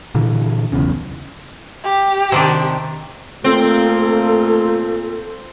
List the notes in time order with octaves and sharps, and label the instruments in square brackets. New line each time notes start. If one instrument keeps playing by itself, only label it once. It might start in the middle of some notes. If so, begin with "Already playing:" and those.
[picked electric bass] A#2 D3 E3
E1 B1 E2 C#3
[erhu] G4
[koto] C3 D#3 D4
[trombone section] A#2 F4 [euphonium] A3 [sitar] C4 [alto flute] A4